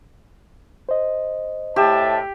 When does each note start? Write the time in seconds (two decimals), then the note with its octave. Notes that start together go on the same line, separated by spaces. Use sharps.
0.89 C5 D#5
1.76 A2 G4 E5 A5